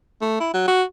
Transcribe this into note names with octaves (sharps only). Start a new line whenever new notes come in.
A3
E4
F#3
F#4